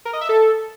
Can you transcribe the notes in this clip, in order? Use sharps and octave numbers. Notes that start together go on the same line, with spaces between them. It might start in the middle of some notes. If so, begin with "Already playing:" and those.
A#4
D#5
E5
A4